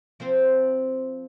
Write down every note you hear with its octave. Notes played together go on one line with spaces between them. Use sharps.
F3 C4 C5